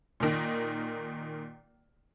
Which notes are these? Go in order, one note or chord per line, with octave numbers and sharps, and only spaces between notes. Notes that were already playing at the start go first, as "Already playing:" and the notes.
A#2 D#3